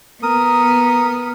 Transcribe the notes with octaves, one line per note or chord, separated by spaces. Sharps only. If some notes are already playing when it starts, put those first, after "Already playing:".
B3 A#4 D#6